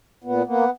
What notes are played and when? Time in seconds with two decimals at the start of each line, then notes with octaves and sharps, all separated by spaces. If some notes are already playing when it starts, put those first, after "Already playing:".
0.24 A#2 B3
0.46 A#3 B3